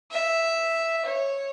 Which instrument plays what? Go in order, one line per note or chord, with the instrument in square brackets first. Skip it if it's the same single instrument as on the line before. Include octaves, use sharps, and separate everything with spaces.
[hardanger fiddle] E5
C#5